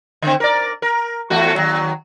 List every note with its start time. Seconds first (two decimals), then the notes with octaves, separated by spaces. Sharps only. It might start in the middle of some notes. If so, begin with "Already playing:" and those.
0.22 D3 C4
0.40 A#4 D5
0.82 A#4
1.30 E2 A3 F#4
1.55 D#2 F#3